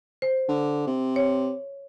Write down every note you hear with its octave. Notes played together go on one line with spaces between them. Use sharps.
C5
D3
C3
C#5